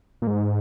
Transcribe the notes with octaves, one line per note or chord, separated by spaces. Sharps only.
A#2
G#2